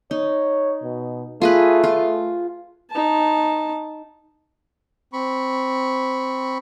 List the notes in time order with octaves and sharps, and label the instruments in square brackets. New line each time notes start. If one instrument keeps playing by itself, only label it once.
[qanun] D#4 [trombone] C#5
[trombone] B2
[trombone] A3 [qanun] F4 G#4 B4
[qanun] F4
[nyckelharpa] D#4 A5
[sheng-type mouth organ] C4 B5 C#6